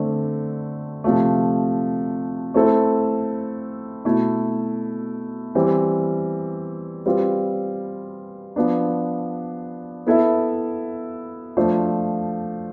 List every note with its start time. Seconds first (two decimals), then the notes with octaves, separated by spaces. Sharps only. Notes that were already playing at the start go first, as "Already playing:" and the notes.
Already playing: D3 A3 C4
1.04 C3 F3 A3
2.54 A3 C4 E4 A4
4.05 B2 A3 E4
5.55 E3 G3 C4
7.06 G3 C4 F4 B4
8.56 F3 B3 D4
10.07 B3 E4 A4 E5
11.57 F3 A3 D4 F4 C5